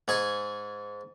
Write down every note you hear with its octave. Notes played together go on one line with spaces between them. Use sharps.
G#2 G#4 G#5 C#6